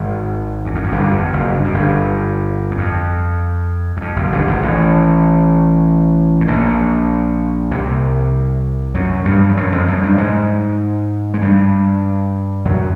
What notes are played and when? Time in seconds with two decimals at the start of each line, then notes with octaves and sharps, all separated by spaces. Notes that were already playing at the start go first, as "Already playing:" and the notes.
Already playing: G#1 G#2
0.65 E2
0.75 F2
0.84 F#2
0.92 G1 G2
1.13 F2
1.33 F#1 F#2
1.54 G2
1.64 F#2
1.74 G1 G2
2.71 F#2
2.78 F2
3.97 F#2
4.01 F2
4.16 F#1 F#2
4.32 G1 G2
4.47 G#1 G#2
4.62 A1 A2
6.41 A2
6.48 A#1 A#2
7.71 C2 C3
8.94 F#2 F#3
9.25 G2 G3
9.49 F3
9.57 F#2 F#3
9.72 F2 F3
9.88 F#2 F#3
10.03 G2 G3
10.18 G#2 G#3
11.34 G#3
11.42 G2 G3
12.65 F#2 F#3